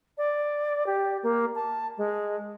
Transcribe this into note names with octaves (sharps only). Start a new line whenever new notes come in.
D5
G4
A#3
A5
G#3